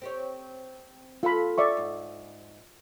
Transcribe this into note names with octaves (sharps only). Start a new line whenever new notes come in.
C4 G4 C#5
F4 A4 F5 B5
D5 E5 C#6
G#2